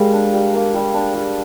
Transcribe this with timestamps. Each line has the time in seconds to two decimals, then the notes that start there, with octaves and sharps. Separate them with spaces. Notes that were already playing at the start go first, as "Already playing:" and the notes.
Already playing: G3 G#3 A#3
0.13 D4
0.33 G3
0.54 A#3
0.74 G3
0.94 D4
1.15 G3